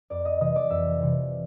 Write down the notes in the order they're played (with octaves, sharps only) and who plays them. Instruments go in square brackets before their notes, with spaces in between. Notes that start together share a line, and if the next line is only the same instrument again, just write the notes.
[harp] F2 D5 D6
D#5 D#6
C3 E3 G3 D#5 D#6
D5 D6
F2 E5 E6
C3 E3 G3